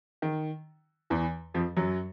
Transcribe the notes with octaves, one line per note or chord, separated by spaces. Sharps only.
D#3
E2 E3
F2 F3
F#2 F#3